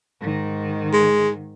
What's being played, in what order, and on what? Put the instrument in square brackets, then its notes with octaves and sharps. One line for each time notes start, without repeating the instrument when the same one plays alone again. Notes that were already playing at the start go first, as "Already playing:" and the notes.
[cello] G#2 D#3
[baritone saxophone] G#3